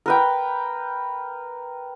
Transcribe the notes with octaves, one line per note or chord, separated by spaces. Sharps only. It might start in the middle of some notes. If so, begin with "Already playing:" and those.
A#4 B4 G5